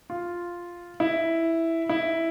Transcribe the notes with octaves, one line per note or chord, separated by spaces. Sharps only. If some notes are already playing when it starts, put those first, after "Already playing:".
F4
E4
E4